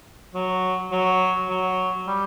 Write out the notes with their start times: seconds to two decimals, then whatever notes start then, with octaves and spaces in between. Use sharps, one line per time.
0.34 F#3
0.92 F#3
1.49 F#3
2.07 G3